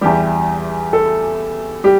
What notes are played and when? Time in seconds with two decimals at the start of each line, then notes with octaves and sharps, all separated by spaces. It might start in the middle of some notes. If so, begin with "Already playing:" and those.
0.01 E2 E3 G3 G4
0.93 A4
1.84 G3 G4